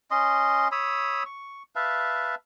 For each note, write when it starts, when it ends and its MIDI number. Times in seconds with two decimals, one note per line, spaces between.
0.11 0.68 61
0.11 0.68 75
0.11 0.68 84
0.72 1.23 73
0.72 1.23 83
0.72 1.23 87
0.72 1.23 88
1.26 1.63 85
1.76 2.35 71
1.76 2.35 76
1.76 2.35 77
1.76 2.35 81